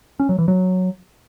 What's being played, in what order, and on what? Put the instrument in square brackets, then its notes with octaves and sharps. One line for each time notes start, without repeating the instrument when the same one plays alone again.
[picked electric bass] C#4
F#3
E3
F#3